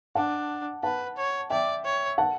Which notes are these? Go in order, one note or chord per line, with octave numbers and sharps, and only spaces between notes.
D4 F#5 A5
B4 F#5 A5
C#5
D5 E5 G5
C#5
F#5 A5